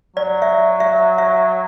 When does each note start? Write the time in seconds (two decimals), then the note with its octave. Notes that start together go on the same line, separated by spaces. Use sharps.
0.17 F#3 D5
0.42 E5
0.80 E5
1.18 E5